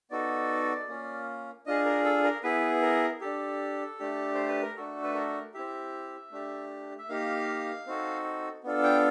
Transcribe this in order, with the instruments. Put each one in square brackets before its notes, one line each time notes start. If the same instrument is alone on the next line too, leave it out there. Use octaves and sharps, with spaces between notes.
[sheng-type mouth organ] B3 D#4 F#4 A4 D5
A#3 C#4 F4
D4 F4 G#4 D#5
A#4
A4
A#4
B3 E4 G#4 B4
A#4
D4 G4 A4
A3 D4 G4
C5
B4
A#4
A3 D4 F#4 A4
B4
A#4
C4 E4 G4 E5
A3 D4 G4
E5
A#3 D#4 G4 F5
C4 D#4 F#4 A4
B3 D4 F4 A4
G5